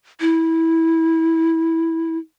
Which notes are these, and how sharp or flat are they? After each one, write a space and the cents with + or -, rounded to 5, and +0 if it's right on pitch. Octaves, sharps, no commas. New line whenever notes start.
E4 -15